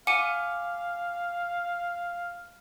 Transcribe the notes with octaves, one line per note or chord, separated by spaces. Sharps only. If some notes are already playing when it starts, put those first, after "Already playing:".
F5 F#5 G#5 D6 C#7 D#7